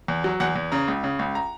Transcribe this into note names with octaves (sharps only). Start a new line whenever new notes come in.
E2
F#3
E2 F#5
E2
C#3 A#5
C#2
C#3
C#2
A#5